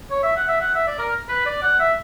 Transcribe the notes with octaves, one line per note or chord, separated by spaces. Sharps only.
C#5
E5
F#5
E5
F#5
E5
D5
A#4
B4
D5
F#5
E5